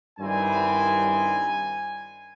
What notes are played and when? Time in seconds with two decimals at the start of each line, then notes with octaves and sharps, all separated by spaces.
0.18 G2 D#3 G3 C4 E4 G#5